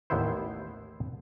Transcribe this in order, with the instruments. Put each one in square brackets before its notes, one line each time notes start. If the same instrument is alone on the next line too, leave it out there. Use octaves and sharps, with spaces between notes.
[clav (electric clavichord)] A1 D#2 B3 E4 C5